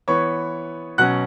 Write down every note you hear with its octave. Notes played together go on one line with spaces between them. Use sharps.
E3 B3 C#5 C#6
B2 F#3 C#4 F#5 F#6